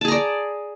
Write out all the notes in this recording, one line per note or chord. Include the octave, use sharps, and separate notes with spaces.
G#4 D5 A5 A#5